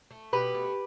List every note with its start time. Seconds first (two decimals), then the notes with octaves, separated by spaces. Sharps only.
0.11 A3
0.33 B2 G4 B4
0.55 A3